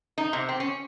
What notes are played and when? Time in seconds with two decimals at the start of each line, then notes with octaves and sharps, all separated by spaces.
0.18 D#4
0.33 C3
0.49 C4
0.60 C#4